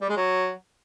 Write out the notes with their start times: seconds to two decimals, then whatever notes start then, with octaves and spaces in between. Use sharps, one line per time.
0.01 G3
0.09 G#3
0.17 F#3